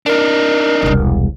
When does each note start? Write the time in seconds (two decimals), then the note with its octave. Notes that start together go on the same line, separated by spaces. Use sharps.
0.06 D4 D#4 A#4
0.82 E1 C2